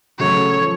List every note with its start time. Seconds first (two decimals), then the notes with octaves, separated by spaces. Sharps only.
0.19 C#3 F#3 A3 C#5
0.61 F3